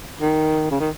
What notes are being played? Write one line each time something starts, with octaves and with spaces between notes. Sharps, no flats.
D#3
C#3
D#3